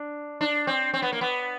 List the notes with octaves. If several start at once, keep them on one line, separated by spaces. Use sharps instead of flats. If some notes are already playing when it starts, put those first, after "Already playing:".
Already playing: D4
D4
C4
C4
B3
A#3
B3